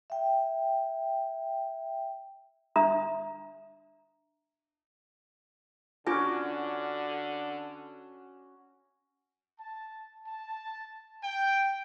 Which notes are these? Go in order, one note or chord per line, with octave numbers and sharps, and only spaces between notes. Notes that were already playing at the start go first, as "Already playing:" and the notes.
E5 G5
D4 E5 A#5 D#6
D3 C#4 D4 F4 F#4 G#5 D6
A5
A5
G5